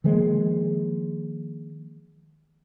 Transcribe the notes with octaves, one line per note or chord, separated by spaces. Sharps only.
D#3 F3 G#3 A#3